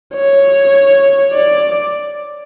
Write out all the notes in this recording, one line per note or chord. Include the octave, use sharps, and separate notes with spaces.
C#5
D5